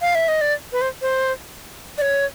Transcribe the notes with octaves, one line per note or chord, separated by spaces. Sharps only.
F5
E5
D#5
D5
B4
C5
C5
D5
C#5